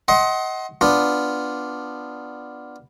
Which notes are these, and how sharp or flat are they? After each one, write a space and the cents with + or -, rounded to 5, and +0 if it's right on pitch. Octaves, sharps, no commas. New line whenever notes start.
D#5 +25 F#5 +20 C6 +20
B3 +0 D4 +0 F4 +0